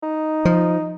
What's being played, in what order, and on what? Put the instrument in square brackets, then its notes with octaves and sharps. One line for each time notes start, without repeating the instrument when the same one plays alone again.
[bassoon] D#4
[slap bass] F3